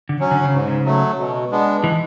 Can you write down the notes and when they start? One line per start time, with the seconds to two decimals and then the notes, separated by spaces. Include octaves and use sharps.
0.09 D3
0.20 F#3 C#4
0.31 D3
0.44 C#3
0.52 G#2
0.68 C#3
0.85 F#3 A3
1.18 B2
1.51 G#3 B3 D4
1.84 E3